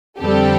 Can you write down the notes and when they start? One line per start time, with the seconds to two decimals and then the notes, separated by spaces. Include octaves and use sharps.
0.20 F2 D3 G3 C4 G4 A4